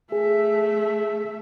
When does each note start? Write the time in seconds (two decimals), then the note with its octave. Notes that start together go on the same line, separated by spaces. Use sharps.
0.12 A3 G#4 E5